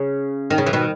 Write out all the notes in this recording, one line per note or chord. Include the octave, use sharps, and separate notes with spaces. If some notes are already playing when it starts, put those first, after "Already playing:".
Already playing: C#3
D#3
C#3
E3
B2 D#3